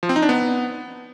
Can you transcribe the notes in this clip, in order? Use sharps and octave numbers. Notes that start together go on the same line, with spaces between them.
F3
C4
D#4
D4
B3